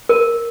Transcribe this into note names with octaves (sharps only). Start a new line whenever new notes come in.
A#4